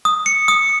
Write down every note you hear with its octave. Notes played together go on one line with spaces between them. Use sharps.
D#6
C#7
D#6